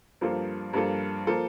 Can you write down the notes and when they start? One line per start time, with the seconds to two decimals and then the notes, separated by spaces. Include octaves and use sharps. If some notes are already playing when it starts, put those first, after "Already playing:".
0.21 G2 F3 A#3 F4 A4
0.73 G2 F3 A#3 F4 A4
1.27 F3 A#3 F4 A4